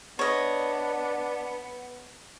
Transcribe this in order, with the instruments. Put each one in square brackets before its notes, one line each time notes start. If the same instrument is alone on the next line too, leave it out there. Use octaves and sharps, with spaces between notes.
[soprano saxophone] B3 [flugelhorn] D4 [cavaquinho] C#5 D#5